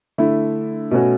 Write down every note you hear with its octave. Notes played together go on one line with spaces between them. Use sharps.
D3 A3 E4
B2 A3 C#4 F#4